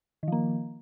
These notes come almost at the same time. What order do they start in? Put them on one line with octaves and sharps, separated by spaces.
D#3 F3 A#3